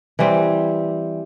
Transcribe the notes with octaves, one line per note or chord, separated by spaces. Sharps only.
E3 G3 C4